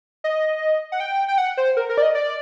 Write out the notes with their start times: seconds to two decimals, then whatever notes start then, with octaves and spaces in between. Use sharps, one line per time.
0.24 D#5
0.92 F#5
1.00 G5
1.28 G5
1.38 F#5
1.57 C5
1.77 A#4
1.89 A#4
1.98 D5
2.02 D#5
2.15 D5